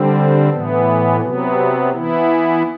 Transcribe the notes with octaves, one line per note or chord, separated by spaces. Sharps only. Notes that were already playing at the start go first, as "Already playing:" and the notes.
Already playing: D3 G3 C4
A2 E3 B3
C3 F#3 B3
E3 B3 E4